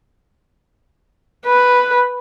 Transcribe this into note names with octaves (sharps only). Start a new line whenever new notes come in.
B4